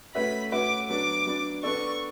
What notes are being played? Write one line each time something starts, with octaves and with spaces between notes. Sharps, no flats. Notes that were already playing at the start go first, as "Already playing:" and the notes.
A3 C#4 F#4 B4 E5 B5
A3 C#4 F#4 B4 E5 D6
F#3 B3 D4 D6
F#3 B3 D4
B3 D4 A4 D5 C#6